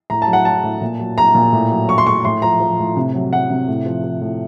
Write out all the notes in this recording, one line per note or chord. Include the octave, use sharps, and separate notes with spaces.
A2 A#5
A5
F#3
F#5
F#3 A5
A2
A#2
F#3
F#3 A#5
A#2
A2
F#3
F#3 C#6
C6
A2 C#6
A2 C6
F3 A#5
F3
A2
C3
F#3
F#3 F#5
C3
A2
F3
F3
A2